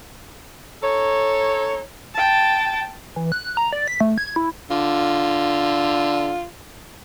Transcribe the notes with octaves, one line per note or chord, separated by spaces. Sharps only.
D#4 A4 C#5
G5 A5
E3
F#6
A#5
D5
B6
A3
G#6
E4
D3 F4